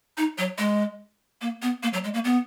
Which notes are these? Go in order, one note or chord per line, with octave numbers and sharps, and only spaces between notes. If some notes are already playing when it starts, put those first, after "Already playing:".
D#4
F#3
G#3
A#3
B3
A#3
F#3
G#3
A#3
B3